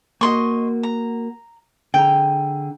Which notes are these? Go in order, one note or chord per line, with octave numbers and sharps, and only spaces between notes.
A#3 F#4 D#5 C6 C#6
A#5
D3 G#4 G5 A#5